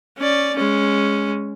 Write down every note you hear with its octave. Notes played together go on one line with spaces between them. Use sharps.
C#4 D5
G#3 C#4